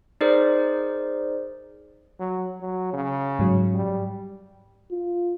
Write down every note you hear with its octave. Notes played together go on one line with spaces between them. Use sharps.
D#4 G#4 A#4 C5 D5
F#3
F#3
C#3
G#2 F#3
G3
F4